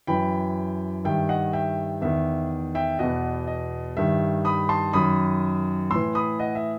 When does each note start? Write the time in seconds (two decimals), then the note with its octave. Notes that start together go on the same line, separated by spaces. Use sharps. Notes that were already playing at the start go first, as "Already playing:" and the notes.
0.07 F#2 E3 G5 B5
1.04 G2 D#3 E5 G5
1.29 D#5 F#5
1.53 E5 G5
2.01 E2 D#3 E5
2.75 E5 G5
2.99 E2 B2 D#5 F#5
3.47 D#5
3.97 G2 D#3 E5
4.45 B5 D#6
4.69 A5 C6
4.93 F#2 D#3 B5 D#6
5.90 A2 E3 C6 E6
6.15 B5 D#6
6.39 D#5 F#5
6.55 E5